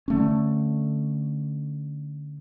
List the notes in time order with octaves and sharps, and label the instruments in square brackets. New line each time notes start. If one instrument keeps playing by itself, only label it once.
[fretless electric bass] D3 A3 C#4